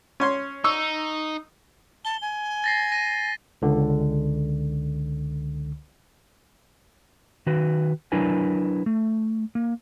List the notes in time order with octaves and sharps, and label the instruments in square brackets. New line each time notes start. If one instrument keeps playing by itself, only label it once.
[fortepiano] C#4 C#5 C6
[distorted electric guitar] D#4 [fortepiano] C#6 E6
[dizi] A5 [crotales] G7
[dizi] G#5
[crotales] A6 A#6 C7
A#6 D#7
[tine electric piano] C#2 D3
[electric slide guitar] D#3 F#4 B4
F#3 D4 E4 A#4 B4 G#5
A3
A#3